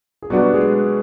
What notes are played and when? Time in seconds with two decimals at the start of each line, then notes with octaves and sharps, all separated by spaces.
0.22 G#4
0.30 B2 F#3 G3 B3 D4 F#4 G4
0.54 G#3 G#4